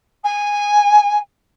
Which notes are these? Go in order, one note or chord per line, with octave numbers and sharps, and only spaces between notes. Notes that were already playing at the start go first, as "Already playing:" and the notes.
G#5